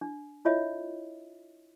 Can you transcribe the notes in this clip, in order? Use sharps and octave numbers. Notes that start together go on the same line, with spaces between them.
D4
E4 F4 C#5 D#5 E5